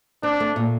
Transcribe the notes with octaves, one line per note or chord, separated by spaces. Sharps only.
C4 D4
A3
A#2